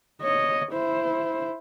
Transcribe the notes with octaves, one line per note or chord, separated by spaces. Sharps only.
C#5 D#5
E4 C5